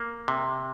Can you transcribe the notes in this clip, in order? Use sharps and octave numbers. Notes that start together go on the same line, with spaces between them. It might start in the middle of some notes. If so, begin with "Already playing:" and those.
Already playing: A#3
C3